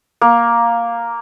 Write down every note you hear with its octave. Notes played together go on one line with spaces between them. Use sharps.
A#3